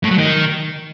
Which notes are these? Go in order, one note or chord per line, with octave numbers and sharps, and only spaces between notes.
A2
F#3
D#3